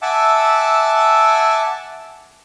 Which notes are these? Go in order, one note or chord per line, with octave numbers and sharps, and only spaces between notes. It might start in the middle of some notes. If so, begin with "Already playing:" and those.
E5 F#5 G#5 A5 D6 E6